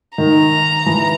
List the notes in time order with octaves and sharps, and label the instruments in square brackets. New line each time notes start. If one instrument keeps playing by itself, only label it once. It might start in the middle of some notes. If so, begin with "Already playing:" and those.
[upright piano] D#3 [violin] A#5
[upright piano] E3